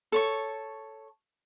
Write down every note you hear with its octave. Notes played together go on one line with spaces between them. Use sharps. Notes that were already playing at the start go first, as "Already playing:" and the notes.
A4 C#5 C#6